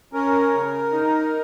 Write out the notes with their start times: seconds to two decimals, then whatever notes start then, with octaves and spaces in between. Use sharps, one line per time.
0.13 C#4 A#4
0.53 C#3
0.92 D#4